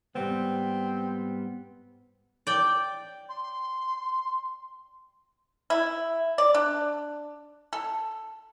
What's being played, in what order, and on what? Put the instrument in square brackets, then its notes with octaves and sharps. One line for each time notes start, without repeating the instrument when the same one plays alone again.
[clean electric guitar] G#2 G3 B3 [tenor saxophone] C4
[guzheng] D5 G5
[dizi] C6
[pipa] E4
D5
D4
A4